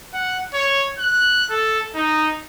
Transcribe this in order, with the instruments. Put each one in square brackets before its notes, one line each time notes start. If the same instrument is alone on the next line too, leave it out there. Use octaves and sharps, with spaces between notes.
[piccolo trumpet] F#5
C#5
F#6
A4
D#4